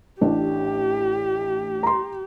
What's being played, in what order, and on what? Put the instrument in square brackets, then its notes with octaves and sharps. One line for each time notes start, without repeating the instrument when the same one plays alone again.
[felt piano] A1 A2 D4 [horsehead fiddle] G4
[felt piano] A#5 C6